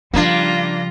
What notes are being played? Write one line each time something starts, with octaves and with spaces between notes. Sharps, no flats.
C#3 F3 G3 A#3 D4 F4 A#6